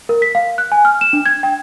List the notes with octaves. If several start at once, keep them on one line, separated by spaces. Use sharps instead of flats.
A#4
B6
F5
F#6
G#5
F6
E7
D4
G#6
G5